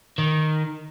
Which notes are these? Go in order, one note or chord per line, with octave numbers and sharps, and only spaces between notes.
D#3